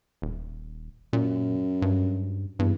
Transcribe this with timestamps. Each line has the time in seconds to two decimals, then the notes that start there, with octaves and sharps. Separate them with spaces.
0.22 D#1
1.13 F#2 A#2
1.82 G2
2.59 E2 G2